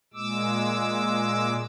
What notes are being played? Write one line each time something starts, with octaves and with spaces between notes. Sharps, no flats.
A#2 G#3 D6 E6